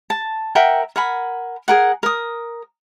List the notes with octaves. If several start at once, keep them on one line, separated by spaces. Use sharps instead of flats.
A5
A#4 E5 F#5 G5
A#4 F#5 G#5 B5
G#4 A#4 F#5
A#4 D#6